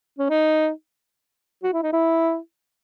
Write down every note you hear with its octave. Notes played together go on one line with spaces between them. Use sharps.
C#4
D#4
F#4
E4
D#4
E4